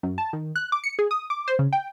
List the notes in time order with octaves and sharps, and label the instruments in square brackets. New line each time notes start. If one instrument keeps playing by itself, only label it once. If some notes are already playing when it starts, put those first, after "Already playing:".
[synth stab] F#2
A5
D#3
F#6
D6
C#7
G#4
D#6
D6
C5
C#3
G5